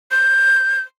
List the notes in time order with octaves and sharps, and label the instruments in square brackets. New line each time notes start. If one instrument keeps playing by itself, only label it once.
[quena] G6